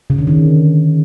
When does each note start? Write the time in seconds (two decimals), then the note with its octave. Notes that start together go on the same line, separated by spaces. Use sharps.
0.10 C#3
0.18 D3
0.27 D#3